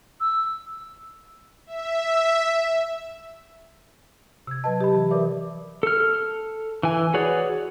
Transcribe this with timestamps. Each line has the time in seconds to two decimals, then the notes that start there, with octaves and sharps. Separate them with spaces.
0.21 E6
1.67 E5
4.47 C3 E6 G#6
4.64 F#3 B4 D#5 A5
4.81 G4 D#5 B5
4.95 E3
5.10 A#4 B4 D5 E5 D6
5.83 A4 F6
6.83 E3 G#5
7.14 F#4 G#4 B4 C#5 D5